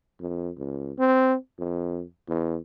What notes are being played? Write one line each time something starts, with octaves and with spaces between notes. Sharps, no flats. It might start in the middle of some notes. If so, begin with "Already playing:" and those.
F2
C#2
C4
F2
E2